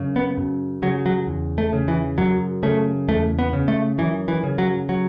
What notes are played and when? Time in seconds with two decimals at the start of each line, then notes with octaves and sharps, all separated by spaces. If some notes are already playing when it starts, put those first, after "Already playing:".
Already playing: F#2 C#3
0.16 B3
0.37 F#2
0.82 C#3 F#3
1.06 F#3
1.27 E2
1.58 A3
1.73 C#3
1.88 E3
2.18 F#2 F#3
2.63 C#3 A3
3.08 E2 A3
3.39 B3
3.53 C#3
3.68 A3
3.98 F#2 E3
4.28 E3
4.43 C#3
4.58 F#3
4.89 F#3